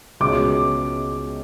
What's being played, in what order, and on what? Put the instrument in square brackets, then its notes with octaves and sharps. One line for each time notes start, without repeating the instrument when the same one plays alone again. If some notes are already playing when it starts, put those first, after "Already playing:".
[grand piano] C#2 B2 G#3 C#4 [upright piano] D6